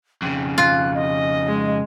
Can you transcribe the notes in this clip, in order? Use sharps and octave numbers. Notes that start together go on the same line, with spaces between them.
F2 C#3 G5
F4 F#6
D#5
G#3